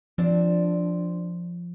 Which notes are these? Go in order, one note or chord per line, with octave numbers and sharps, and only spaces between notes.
F3 C4 D4